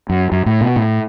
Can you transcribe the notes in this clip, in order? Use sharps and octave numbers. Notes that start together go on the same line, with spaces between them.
F#2
F#2
A2
B2
A2